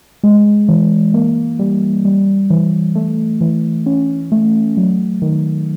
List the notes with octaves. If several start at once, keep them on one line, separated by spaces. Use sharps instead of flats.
G#3
E3
A#3
G3
G3
E3
A3
E3
C#4
A3
F#3
D#3